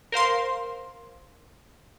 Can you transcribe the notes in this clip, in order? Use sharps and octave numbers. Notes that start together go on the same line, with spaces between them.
A#4 C5 F5 C6